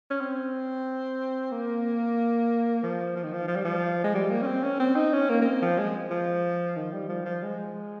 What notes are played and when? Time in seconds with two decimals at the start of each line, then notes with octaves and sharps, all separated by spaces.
0.10 C#4
0.21 C4
1.51 A#3
2.83 F3
3.16 F3
3.24 D#3
3.33 F3
3.48 F3
3.56 G3
3.65 F3
4.04 G#3
4.15 G3
4.31 A#3
4.42 C#4
4.47 C4
4.63 C#4
4.80 C4
4.95 D#4
5.13 C#4
5.29 A#3
5.42 A#3
5.45 C4
5.62 F3
5.78 G#3
6.10 F3
6.76 D#3
6.93 G3
7.09 F3
7.25 F3
7.43 G#3